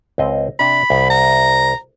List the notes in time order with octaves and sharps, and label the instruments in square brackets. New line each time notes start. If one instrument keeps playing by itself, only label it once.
[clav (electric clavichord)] C#2 C4 D#5
[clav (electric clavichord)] C3 D4 [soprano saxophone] B5
[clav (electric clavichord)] C2
[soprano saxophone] A#5